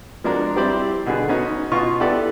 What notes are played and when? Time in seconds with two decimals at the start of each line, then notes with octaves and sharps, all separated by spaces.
0.24 F3 G#3 D4 F#4 A#4
0.56 G3 C4 E4 G4 C5 D5
1.06 B2 D3 G#4 B4
1.28 B3 C#4 D#4 F#4
1.72 B2 F4 D#5 C#6
2.00 B3 E4 G4 A4 D5